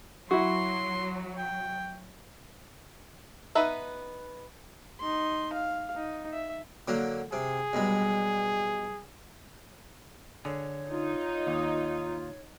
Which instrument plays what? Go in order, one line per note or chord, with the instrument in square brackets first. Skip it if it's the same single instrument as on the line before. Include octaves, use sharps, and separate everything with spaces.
[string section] F#3 [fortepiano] E4 F#4 [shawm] C6
[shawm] G5
[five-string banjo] B3 D#4 B4 E5
[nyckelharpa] D#4 C6
F5
D#4
E5
[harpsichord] D3 F#3 A#3
[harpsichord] C3 [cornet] G#4
[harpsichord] B1 G2 G#3
[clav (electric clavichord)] D3 G#4 [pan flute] C#5
[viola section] D#4 [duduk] F4
[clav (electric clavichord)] D#2